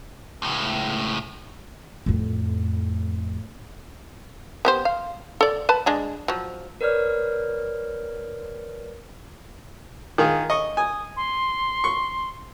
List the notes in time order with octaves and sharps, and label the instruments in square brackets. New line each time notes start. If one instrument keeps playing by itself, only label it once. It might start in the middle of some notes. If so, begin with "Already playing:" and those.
[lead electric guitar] C#2 A2
[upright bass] F2 A2
[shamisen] B3 G4 C5
F5
A4 D5
B4 A5 B5
G#3 D4 G#4
F3 F#3
[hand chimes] A#4 B4 C#5 D5 F6
[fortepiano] D#3 F4 G#4
D#5 C#6
[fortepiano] G#5 [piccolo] D#6
[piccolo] C6
[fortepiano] C#6